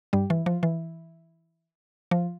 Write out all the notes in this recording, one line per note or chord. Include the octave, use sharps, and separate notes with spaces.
G2 G3
E3
F3
E3
F3